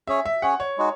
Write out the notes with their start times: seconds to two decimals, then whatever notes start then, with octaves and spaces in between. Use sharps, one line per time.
0.07 C#4 G#4 C#5 E5
0.26 E5
0.42 C#4 G#4 C#5 F#5
0.60 C#5
0.78 G#3 D#4 F#4